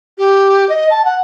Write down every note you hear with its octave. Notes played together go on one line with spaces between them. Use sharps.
G4
D#5
A5
F#5